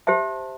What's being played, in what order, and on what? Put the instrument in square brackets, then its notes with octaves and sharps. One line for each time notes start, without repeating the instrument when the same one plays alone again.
[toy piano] G4 C5 E5 A5